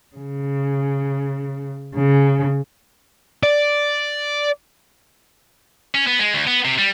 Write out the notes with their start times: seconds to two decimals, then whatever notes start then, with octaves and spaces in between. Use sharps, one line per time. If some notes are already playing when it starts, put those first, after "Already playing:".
0.17 C#3
1.95 C#3
3.43 D5
5.95 C#4
6.07 B3
6.19 G#3
6.34 D2
6.47 B3
6.65 C3
6.78 G3